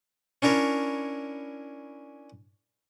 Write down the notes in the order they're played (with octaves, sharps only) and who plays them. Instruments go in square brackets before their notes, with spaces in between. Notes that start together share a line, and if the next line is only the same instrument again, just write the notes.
[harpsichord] C#4 D4 E4 A#4 C#5